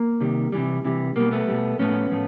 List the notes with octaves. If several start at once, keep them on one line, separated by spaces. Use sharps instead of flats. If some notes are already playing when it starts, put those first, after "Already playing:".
Already playing: A#3
C3 D#3 G3
C3 E3 G3
C3 E3 G3
B2 G3 A#3
A3 B3
B2 G3
A2 F3 A3 B3 C#4
A2 F3 A3